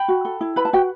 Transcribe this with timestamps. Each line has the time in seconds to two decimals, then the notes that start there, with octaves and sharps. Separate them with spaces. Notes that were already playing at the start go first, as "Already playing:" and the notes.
Already playing: G5 B5
0.08 F#4
0.25 A4
0.41 E4
0.56 B4 B5
0.65 A5
0.73 F#4 G5